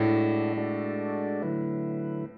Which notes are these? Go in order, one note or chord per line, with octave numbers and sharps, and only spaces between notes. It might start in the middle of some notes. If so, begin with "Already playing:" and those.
Already playing: A2 G#3 D4 F#4 A4 D5
G#3 D4 F#4 A4 D5
D3 F#3 A3 E4 B4